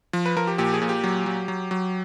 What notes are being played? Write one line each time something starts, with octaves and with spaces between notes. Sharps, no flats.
F3
B4
F3 A#4
G4
A#2 G4
G#4
A#2
G4
F#3
F#3
F#3
F#3